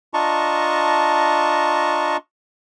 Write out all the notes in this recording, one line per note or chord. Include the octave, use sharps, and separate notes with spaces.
D4 F4 D#5 A5 A#5 C#6